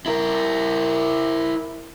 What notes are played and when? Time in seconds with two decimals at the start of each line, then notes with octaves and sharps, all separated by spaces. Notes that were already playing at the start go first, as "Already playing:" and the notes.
0.06 E4 A#4